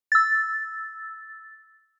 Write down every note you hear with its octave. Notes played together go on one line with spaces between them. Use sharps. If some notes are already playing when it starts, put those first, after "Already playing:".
E6 A6